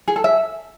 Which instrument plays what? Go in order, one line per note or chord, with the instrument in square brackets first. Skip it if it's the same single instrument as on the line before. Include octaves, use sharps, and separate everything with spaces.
[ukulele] G#4
A4
E5